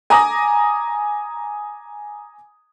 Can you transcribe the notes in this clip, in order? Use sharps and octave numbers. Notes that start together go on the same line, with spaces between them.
G#5 A#5 D6 D#6 A#6